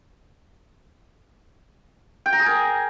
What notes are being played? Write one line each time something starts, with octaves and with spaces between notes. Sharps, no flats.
G5
A#5
G#4
A#4